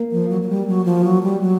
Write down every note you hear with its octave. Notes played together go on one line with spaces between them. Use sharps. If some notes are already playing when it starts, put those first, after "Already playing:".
Already playing: A#3
F3
F#3
F#3
G3
F#3
F3
F#3
G3
F#3